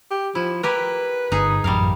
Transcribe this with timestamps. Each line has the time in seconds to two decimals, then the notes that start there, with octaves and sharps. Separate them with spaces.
0.11 G4
0.35 F3 E4
0.63 E4 G4 A#4 B4
1.32 G1 D#4 G#4
1.64 A1 F#2 G3 A#4 F5